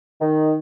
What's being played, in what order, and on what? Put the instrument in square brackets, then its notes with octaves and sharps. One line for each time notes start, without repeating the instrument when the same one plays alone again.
[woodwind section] D#3